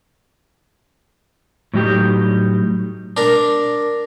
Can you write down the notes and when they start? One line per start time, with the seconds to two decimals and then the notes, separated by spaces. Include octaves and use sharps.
1.73 A2 F#3 G3 D4 D#4 G4
3.17 D4 A#4